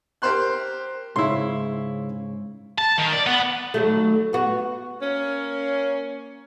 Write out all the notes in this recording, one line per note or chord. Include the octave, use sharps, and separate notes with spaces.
G4 A#4 C5 C6 F#6
G#2 C#3 E4 C6
A5
D#3
D5
B3
D#2 F#3 A3
B3 F#4
A#3 C#4